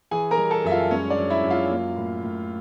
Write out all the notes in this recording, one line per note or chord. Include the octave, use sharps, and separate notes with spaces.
E3 G#4 G#5
A#4 A#5
G3
A4 A5
F#2 E5
F4 F5
G#3 C#4 C#5
D4 D5
F#2
E4 E5
F#2
F4 F5
A#3
A2
A2